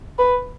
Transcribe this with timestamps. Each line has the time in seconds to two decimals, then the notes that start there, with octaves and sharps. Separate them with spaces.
0.19 B4